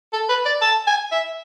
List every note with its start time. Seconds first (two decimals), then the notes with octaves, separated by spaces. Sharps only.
0.13 A4
0.29 B4
0.46 D5
0.62 A5
0.87 G#5
1.12 E5